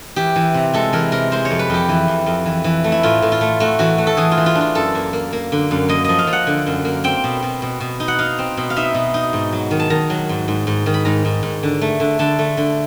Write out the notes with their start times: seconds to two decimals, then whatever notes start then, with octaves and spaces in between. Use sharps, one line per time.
0.16 E3 G4
0.36 E3
0.54 C3
0.74 G#3 A4
0.93 E3 A#4
1.12 C3 A#4
1.32 G#3 C5
1.45 C#5
1.51 F2
1.59 B4
1.70 F2 G4
1.89 E3
2.08 F2
2.26 F2
2.46 E3
2.64 E3
2.84 A3
2.92 E4
3.03 A2 F4
3.22 A2
3.32 F4
3.41 A3
3.60 A3 F#4
3.79 E3 F#4
3.98 A3
4.07 A4
4.17 E3 G#4
4.31 F4
4.37 E3
4.46 F4
4.55 D4
4.61 F4
4.75 F#2 A4
4.95 A#3
5.13 A#3
5.33 A#3
5.52 D3
5.71 F#2
5.89 A#3 D#5
6.04 F3 D#5
6.18 F5
6.27 F3
6.33 F#5
6.47 D3
6.67 F#2
6.85 A#3
7.04 C4 G5
7.24 B2
7.43 B2
7.62 B2
7.80 B2
8.00 D#4
8.08 F#5
8.19 D#4 F5
8.38 C4
8.57 B2
8.70 F5
8.76 D#4 E5
8.94 B2
9.14 D#4
9.33 G#2
9.52 F#3
9.71 D#3
9.80 A5
9.90 D#3 A#5
10.10 F#3
10.29 G#2
10.48 G#2
10.67 G#2
10.86 D#3
10.94 B5
11.05 G#2 A#5
11.25 G#2
11.43 G#2
11.63 D3
11.81 A3
12.00 D3
12.19 D3 A5
12.39 A3
12.57 D3